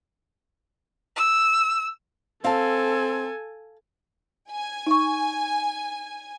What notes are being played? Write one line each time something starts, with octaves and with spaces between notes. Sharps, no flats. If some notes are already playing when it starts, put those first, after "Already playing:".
E6
C4 A4 F5 G#5 A5
G#5
D#4 C#6